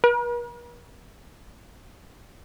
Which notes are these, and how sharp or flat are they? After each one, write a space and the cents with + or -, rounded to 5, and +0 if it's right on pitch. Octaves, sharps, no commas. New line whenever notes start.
A#4 +45